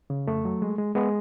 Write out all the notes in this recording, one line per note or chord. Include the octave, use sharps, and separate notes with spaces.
C#3
F2 A3
F#3
G#3
G#3
G#3 B3